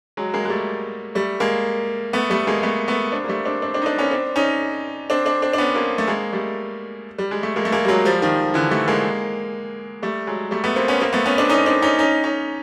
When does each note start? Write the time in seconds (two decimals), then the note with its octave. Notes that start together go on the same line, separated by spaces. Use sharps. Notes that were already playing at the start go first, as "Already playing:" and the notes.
0.17 F#3 G#3
0.33 G#3 A#3
0.45 G#3
0.49 G3 A3
1.15 G3 A3
1.40 G#3 A#3
2.13 A3 B3
2.30 G3 A3
2.47 G#3 A#3
2.63 A3 B3
2.88 A3 B3
3.12 C4 D4
3.24 A#3
3.28 G3 A3
3.45 C4 D4
3.62 C4 D4
3.74 C4 D4
3.82 D#4
3.86 C4 D4
3.98 B3 C#4
4.11 C4 D4
4.36 C#4 D#4
5.10 C4 D4
5.26 C4 D4
5.42 C4 D4
5.53 D4
5.58 B3 C#4
5.75 A#3 C4
5.98 A3
6.08 G#3 A#3
6.33 G3 A3
7.18 G3
7.31 G#3
7.43 A3
7.56 G#3 A#3
7.65 A3
7.72 G#3 A#3
7.85 G3
7.88 F#3 G#3
8.05 F3 G3
8.22 D#3 F3
8.54 D3 E3
8.70 G3 A3
8.88 G#3 A#3
10.02 G3 A3
10.27 F#3 G#3
10.51 G3 A3
10.64 A3 B3
10.76 A#3 C4
10.88 B3 C#4
11.00 A#3 C4
11.13 A3 B3
11.26 B3 C#4
11.38 C4 D4
11.50 C#4 D#4
11.66 C4 D4
11.82 C#4 D#4
11.99 C#4 D#4
12.24 C#4 D#4